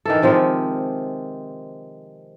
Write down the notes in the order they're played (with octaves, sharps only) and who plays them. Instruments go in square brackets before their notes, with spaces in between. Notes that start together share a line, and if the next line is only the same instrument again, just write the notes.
[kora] D#3 E3 A4
C3 D#3 F3 G#3